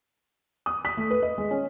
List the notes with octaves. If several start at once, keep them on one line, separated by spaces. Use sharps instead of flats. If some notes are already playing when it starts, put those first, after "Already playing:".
D#6
B6
A3
B4
D#5
G#3
C#4